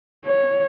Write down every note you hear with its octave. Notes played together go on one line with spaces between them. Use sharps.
C#5